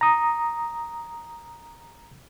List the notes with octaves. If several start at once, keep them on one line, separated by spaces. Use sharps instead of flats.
A#5 D#6